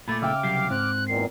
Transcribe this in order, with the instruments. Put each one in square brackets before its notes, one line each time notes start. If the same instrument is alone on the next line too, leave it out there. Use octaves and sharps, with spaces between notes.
[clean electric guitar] A#2 A3 [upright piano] B5 D6 [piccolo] A6
[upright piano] C#3 E5 G5 [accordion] D6 F6 [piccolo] E6
[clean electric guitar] C2 F#3 G4 [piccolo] C7
[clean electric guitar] G#2 [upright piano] C4 [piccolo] F#6
[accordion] E2 A#2 D#3 [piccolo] C7